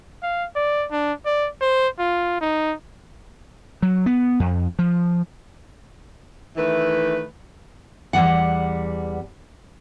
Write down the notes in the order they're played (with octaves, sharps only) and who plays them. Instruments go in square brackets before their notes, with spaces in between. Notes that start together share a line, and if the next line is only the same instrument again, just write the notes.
[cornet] F5
D5
D4
D5
C5
F4
D#4
[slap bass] F#3
B3
F2
F3
[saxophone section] D#3 E3 A3 B4
[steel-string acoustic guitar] E2 G3 F#5